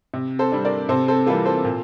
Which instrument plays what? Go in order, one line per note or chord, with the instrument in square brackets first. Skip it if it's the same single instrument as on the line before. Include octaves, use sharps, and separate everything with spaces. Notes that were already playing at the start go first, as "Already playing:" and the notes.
[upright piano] C3
A4 C5
G3 D4
A#4 D5
C3 A4 C5
A4 C5
E3 G3 A#3 F4 A4
A4 C5
A#2